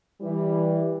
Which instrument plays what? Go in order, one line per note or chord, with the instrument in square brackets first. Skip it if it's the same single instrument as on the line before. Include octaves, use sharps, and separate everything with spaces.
[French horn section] E3 G3